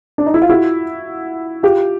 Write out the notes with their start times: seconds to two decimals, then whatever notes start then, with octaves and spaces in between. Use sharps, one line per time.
0.18 D4
0.26 D#4
0.34 E4
0.42 F4
0.49 E4 F#4
1.63 F4 G4